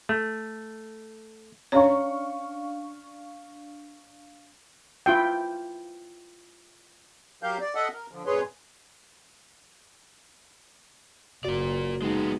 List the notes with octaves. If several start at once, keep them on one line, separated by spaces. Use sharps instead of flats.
A3
C#4 D4 C#5 F5 C#6
E4 F4 G5
F#3 G4 A#4 F5 G6
D5
A4 D#5 E5 F#5
A#4
D3 F3
F#2 A#2 G#4 B4 C#5 C6
F#1 F#4 A#4 D5
G#3 B3 D#4